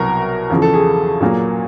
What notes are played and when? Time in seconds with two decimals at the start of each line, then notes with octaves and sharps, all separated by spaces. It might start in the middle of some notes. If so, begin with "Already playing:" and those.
Already playing: C2 B2 F#3 A#4
0.50 E2 C#3 F3
0.62 A4
0.74 G#4
1.21 A#2 F#3 A#3